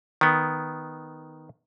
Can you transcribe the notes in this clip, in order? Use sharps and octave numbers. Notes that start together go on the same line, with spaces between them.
D#3 B3